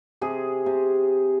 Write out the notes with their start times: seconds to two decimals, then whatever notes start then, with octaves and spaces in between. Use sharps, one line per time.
0.21 C3 G#4
0.66 C3